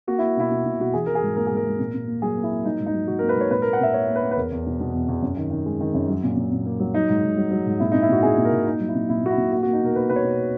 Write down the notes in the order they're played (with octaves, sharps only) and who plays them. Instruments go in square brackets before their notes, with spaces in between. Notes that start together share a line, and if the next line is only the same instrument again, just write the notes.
[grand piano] A#3 F#4
A#3 E4
B2 E4
B2
B2
B2 F#4
E3 G#4
E3 A#4
G#4
G#2
A#3 A#4
G#2 G#4
A#4
G#2
A#2
A#2
A#3
F#3 G#4
A#3
E4
A#3
F#3 D#4
G#2
D#4
F#3
G#2 F#4
A#3 A#4
B4
G#2 C#5
A#2 B4
A#3 A#4
F#5
A#2 E5
A#3 C#5
A#3
B4
A#3
B4
E2 A#4
E2
B2
B2
E2
E2
F#2
D#3
D#3
G#3
D#3
F#2
F#3
A#2
A#2
A#2
A#3
F#3
F#3 D#4
G#2
G#2
F#3
F#3
G#2
A#2 E4
A#2 D#4
E4
A#2 F#4
A#2 G#4
A#2
A#4
A#2
A#3 D#4
F#3
E4
A#2
A#2 E4
A#2 F#4
E4
A#2
A#3 F#4
A#3 F#4
D#4
B2 A#4
A#3 B4
B2 B4
C#5
B2